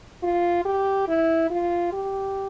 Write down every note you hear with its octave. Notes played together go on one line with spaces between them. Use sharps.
F4
G4
E4
F4
G4